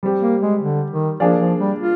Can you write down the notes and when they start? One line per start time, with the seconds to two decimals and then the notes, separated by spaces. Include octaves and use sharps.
0.03 G3 C4 G4
0.21 A#3
0.41 G#3
0.62 D3
0.90 D#3
1.20 F3 A#3 D4 G#4 D5 F5
1.39 F3
1.59 G3
1.79 F4